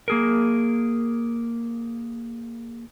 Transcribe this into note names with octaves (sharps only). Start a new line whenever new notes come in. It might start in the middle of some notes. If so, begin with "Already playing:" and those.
A#3 G#4 A#4